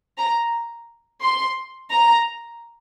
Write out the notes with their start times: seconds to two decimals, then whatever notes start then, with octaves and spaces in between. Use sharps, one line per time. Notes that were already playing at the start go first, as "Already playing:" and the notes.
0.18 A#5
1.22 C6
1.91 A#5